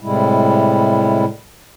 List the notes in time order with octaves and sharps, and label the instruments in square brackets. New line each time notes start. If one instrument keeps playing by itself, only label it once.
[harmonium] A2 C3 G3 G#3 E4